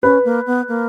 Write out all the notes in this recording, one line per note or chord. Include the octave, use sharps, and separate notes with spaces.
C#4 B4
A#3
B3
A#3